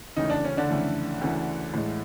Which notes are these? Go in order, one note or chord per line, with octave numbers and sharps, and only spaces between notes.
D2 C#3 E3 D#4
D4
C#4
D3 D4
F2 C#3 E3 A3
D2 C#3 E3
A2 E3 G#3